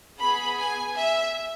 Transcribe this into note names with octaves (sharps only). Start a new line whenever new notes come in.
B3 G#4 B5
G#5
E5